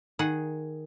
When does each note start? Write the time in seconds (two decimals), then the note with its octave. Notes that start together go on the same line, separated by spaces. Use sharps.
0.19 D#3 G#4 F#5